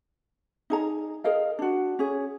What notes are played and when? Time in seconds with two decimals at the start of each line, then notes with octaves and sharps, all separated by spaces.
0.70 D#4 G#4 A#5
1.24 G#4 A#4 D#5 F5
1.59 D4 F#4
1.99 C#4 G#4